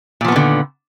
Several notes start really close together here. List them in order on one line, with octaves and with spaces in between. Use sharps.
A#2 F3 B3 D#3 D3